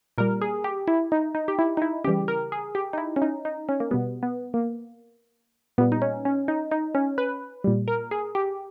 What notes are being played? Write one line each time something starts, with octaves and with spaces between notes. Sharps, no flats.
A#2 G3 A#4
G#4
G4
E4
D#4
D#4
G4
E4
D#4
E4
C#3 E3 G3 G4
A#4
G#4
G4
D#4
E4
C#4
D#4
D#4
C#4
A#3
B2 G3 B3
B3
A#3
A#2 G3 B3
D#4
C#4
C#4
D#4
D#4
C#4
B4
A#2 G3
A#4
G#4
G4